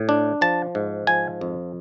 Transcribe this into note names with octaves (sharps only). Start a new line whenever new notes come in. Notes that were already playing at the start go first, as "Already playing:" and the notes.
Already playing: A2
D4
F3 A5
G#2
F3 G#5
F2